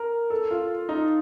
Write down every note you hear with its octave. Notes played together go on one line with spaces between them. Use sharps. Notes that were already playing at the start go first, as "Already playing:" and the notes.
Already playing: A#4
A4
F4
D#4